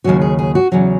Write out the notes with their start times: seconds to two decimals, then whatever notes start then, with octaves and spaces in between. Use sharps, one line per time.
0.04 D#2 C#3 F#3 F#4
0.21 G#4
0.39 G#4
0.55 F#4
0.72 E2 C#3 F#3